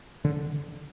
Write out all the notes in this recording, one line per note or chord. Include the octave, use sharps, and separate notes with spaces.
D3